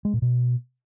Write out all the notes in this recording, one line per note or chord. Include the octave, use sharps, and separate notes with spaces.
G#3
A#2
B2